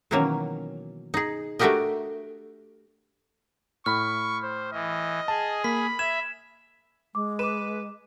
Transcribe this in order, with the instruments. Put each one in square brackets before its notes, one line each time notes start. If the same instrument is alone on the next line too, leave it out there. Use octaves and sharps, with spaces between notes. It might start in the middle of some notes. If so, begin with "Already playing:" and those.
[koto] B2 D#3 E3 F#3 A#3 C#4
D#4 G#4
A3 D4 F#4 G4 A#4 D#5
[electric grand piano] A2 B5 [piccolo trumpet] C#6 [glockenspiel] F6
[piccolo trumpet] C5
[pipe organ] E3 [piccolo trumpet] D#5
[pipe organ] G#4 [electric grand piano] A5
[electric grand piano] A#3 [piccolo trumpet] B5 [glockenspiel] B6
[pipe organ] E5 [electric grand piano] G#6 [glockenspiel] E7
[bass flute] G#3 [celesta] D6
[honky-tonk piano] B4 [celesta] D6 E7